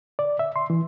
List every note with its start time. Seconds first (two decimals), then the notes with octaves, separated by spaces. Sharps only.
0.19 D5
0.39 E5
0.56 C6
0.70 E3